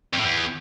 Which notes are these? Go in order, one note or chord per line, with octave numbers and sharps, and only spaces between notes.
F2
A2
E2